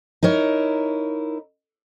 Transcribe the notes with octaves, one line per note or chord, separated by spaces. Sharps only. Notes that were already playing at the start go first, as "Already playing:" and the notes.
D#4 E4 A#4 C#5